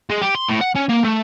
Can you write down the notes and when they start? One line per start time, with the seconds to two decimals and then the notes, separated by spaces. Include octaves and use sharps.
0.10 G#3
0.22 G4
0.35 C6
0.48 A2
0.61 F#5
0.75 C#4
0.89 A#3
1.05 A3